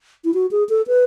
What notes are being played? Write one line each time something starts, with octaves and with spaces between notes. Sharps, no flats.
E4
F#4
G#4
A4
B4